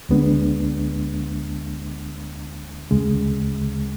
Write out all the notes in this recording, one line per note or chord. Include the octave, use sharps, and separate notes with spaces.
D2 D3 G#3 B3 D4
D2 C#3 G#3